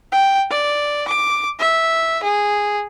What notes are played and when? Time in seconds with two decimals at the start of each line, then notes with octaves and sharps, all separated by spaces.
0.12 G5
0.50 D5
1.08 D6
1.59 E5
2.23 G#4